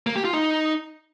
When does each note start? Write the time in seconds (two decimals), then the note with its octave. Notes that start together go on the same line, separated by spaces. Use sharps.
0.07 A#3
0.16 G4
0.24 F4
0.33 D#4